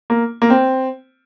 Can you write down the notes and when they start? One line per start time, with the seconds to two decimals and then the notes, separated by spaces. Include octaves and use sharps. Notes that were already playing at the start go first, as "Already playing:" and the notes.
0.10 A#3
0.42 A#3
0.50 C4